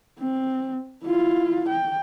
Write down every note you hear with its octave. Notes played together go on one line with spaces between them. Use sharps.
C4
E4 F4
G5